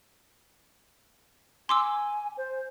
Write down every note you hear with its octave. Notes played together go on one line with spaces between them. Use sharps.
G#5 C6 D6 E6
C5